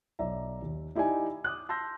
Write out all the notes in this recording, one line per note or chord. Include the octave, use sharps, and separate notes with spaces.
B1 D5 E5 A#5
D#2
D#4 E4 G4 D5 G#5
D6 D#6 F#6
A5 C6 E6 G6 A#6